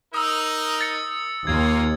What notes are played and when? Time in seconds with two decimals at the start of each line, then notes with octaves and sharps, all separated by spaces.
0.14 D#4 A#4 D#6 E6
0.81 A6 C#7
1.47 D#2 A#3 F4 G#6